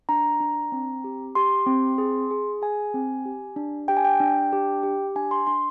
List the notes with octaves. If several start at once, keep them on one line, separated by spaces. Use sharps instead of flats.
D4 A#5
D4
C4
G4
G4 C6
C4
G#4
G#4
G#4 G#5
C4
G4
D4
G4 G5
G#5
G5
D4
G4
G4
D4 G#5
C6
D4 C6